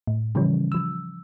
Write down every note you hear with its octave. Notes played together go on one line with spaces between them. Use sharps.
A2
C#3 E3 F3 G3 C#4
F3 E6